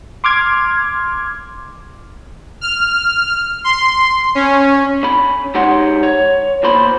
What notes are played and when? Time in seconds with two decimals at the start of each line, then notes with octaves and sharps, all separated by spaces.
0.24 C6 D6 F6 G#6
2.61 F6
3.64 C6
4.35 C#4
5.03 C#4 B5
5.55 G#3 D#4 G4 C#5 F#5 C6
6.03 C#5
6.63 E2 A#2 C5 B5